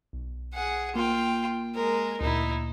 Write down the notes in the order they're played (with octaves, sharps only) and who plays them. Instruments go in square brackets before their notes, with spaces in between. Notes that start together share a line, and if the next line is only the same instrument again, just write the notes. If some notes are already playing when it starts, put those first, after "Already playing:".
[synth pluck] B1
[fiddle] G#4 F#5
[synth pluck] A#3 [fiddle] F4 G5
[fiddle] G#3 A#4
[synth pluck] D2 A#2 [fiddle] D#4 E4